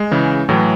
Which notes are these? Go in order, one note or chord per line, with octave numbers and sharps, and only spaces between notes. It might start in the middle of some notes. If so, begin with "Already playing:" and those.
Already playing: G#3
C#3 E3
A2 E3 F#3